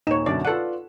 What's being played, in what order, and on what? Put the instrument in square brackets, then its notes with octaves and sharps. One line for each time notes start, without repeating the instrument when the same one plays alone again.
[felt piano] D#1 E7 [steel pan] D#4 C#5
[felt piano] F#2 B2 D3 [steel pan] D5
[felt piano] F4 B4 D5 [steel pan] A4 F#5